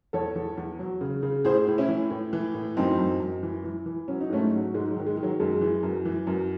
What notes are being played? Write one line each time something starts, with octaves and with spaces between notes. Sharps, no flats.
E2 A4 C#5
E2
E2
F#3
C#3
C#3
A2 G#4 C5
A2
C#4 E4
E3
A2
E3
A2
F#2 C4 D#4
F#2
F#2
E3
E3
E3
F#3 C#4
D#4
G#2 A3 C#4
F#3
G#2 G#3
F#3
D#3
G#3
D#3
F#3
F#2 G#3
E3
F#2
E3
F#2